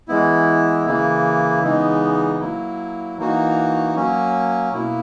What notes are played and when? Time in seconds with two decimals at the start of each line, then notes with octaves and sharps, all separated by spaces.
0.08 E3 G#3 B3 E4
0.86 C#3 E3 A#3 E4
1.63 C#3 E3 G#3 B3 D#4
2.40 F#3 A#3 E4
3.18 E3 A#3 D#4 F#4
3.95 F#3 A#3 C#4
4.73 B2 A#3 E4